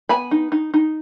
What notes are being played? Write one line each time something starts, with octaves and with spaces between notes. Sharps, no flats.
B3 G#5 B5
D#4
D#4
D#4